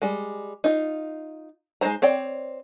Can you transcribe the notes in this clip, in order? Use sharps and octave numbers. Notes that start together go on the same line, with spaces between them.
G3 G#3
D#4 F4
G#3 D#4 A4 C5 A#5
C4 C#5 D5 G5